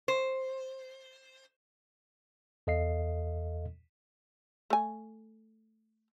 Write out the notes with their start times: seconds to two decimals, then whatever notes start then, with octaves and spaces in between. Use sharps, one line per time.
0.08 C5
2.67 E2 A4 D#5 F5 C7
4.70 A3 G#5